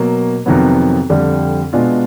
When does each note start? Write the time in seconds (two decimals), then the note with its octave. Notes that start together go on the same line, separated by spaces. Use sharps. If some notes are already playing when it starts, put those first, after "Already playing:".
Already playing: B2 F#3 A#3
0.46 F2 C3 D#3 F#3 B3
1.10 F2 D3 G3
1.73 B2 G#3 B3 D4 F4